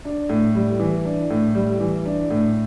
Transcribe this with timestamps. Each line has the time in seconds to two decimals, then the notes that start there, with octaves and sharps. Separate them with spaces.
0.05 D4
0.29 A2
0.55 G3
0.79 E3
1.05 D4
1.30 A2
1.55 G3
1.80 E3
2.05 D4
2.30 A2